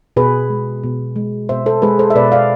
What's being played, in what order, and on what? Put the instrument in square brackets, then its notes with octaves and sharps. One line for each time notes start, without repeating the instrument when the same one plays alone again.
[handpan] B2 G#4 B4
G#3
B2
G#3
B2 C5 E5
A4 C5
G#3 G#4 B4
A4 C5
E5
B2 B4 D5
D5 F5